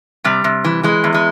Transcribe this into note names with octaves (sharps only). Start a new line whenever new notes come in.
C3 G3
C3
E3
E3 G#3
E2
G#3